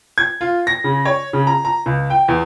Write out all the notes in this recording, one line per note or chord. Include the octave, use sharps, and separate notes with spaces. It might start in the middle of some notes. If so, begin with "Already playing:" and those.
G#6
F4
A#6
C#3
C#5
C#3
A#5
A#5
C#2
G5
E2